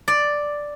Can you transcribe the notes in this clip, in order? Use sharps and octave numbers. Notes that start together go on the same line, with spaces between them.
D5